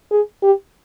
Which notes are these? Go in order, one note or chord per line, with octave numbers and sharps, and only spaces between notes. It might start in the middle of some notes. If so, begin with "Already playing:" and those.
G#4
G4